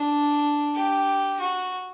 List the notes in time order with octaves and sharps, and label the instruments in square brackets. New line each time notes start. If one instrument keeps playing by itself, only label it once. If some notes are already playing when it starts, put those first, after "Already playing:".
Already playing: [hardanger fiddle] D4
G4
F#4